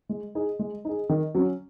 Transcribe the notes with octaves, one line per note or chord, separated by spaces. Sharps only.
G#3
D#4 G#4
G#3
D#4 G#4
D#3
F#3 C#4